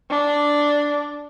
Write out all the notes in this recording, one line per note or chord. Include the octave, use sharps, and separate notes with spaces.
D4